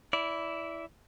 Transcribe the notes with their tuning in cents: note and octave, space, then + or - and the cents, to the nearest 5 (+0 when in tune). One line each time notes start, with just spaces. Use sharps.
E4 +0 D5 -20